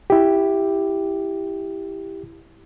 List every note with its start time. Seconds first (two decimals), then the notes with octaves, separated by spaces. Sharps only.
0.10 E4 G4